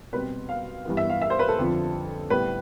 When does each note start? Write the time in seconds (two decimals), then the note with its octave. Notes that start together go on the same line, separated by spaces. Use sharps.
0.13 B2 G3 C4 B4
0.49 F5
0.85 G2 E3 B3
0.97 E5
1.10 F5
1.21 E5
1.30 C5
1.39 B4
1.49 A4
1.58 F2 D3 F3
2.30 A2 G3 B3 B4